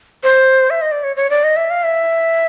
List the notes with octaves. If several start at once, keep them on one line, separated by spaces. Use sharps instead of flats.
C5
E5
D#5
D5
C#5
C#5
D5
D#5
E5
F5
E5